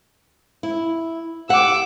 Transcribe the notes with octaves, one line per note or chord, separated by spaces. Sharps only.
E4
G4 F#5 D6 E6